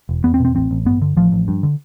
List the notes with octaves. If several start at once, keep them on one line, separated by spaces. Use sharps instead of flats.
E1
E2 B3
C4
B2
C4
A1 C4
A1
G2 B3
D3
A1 F3
A1
G2
D3